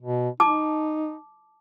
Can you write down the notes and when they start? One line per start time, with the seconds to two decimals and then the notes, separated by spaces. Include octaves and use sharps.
0.02 B2
0.40 D#4 A5 D6